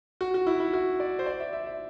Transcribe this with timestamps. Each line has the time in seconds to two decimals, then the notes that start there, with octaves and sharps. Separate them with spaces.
0.21 F#4
0.34 F#4
0.47 E4
0.60 E4
0.73 F#4
1.00 D5
1.19 C5
1.26 D5
1.40 E5
1.53 E5
1.66 E5